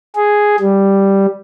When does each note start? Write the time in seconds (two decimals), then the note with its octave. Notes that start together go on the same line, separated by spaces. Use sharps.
0.15 G#4
0.60 G3